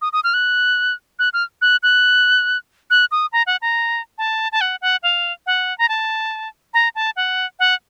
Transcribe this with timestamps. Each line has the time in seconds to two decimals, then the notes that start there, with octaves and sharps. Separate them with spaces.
0.02 D#6
0.13 D#6
0.24 F6
0.34 F#6
1.19 F#6
1.33 F6
1.62 F#6
1.83 F#6
2.90 F#6
3.11 D#6
3.33 A#5
3.47 F#5
3.62 A#5
4.18 A5
4.52 A5
4.61 F#5
4.81 F#5
5.03 F5
5.46 F#5
5.78 A#5
5.89 A5
6.74 A#5
6.95 A5
7.16 F#5
7.59 F#5